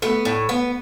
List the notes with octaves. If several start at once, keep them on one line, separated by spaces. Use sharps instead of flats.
A3 B3
A2
B3